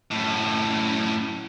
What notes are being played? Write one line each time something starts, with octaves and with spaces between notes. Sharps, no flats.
F#2 A2